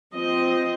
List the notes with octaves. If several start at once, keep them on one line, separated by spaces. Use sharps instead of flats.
F3 C4 D#5